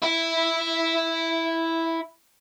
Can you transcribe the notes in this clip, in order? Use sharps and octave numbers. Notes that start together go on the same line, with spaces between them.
E4 E5